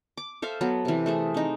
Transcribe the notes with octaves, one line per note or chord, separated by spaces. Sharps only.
D6
A4 C5 E5 F5
F#3 B3 A4
C3 E3
A3 C4 G#4
C4 D#4